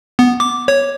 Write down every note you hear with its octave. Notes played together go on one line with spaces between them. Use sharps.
B3
D6
C#5